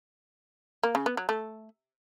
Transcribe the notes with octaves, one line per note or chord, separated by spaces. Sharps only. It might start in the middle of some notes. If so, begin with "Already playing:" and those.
A#3
C#3
B3
F#3
A3